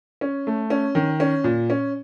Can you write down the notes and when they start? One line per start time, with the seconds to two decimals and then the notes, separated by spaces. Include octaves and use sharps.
0.21 C#4
0.47 A3
0.70 C#4
0.95 D#3
1.20 C#4
1.44 A#2
1.70 C#4